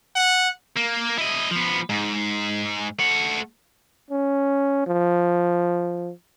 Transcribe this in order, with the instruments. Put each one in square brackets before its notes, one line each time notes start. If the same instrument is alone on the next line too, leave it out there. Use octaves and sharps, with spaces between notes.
[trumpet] F#5
[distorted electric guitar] A#3
E4 D#5
F3 B3
G#2
A3 F#5
[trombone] C#4
F3